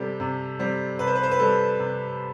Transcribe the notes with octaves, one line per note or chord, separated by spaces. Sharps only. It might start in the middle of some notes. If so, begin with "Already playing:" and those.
Already playing: C3 G3 C4 G4 A4
C3
G3 C4
C3 B4
C5
B4
C5
B4
G3 C4 A4
C3